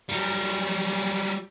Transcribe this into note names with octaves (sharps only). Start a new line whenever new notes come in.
F#3 G3